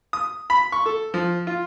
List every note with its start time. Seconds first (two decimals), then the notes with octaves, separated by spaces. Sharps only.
0.13 D#6
0.50 B5
0.72 C#6
0.86 A4
1.14 F3
1.47 F4